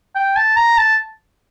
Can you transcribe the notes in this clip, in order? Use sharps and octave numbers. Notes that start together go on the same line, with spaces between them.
G5
A5
A#5
A5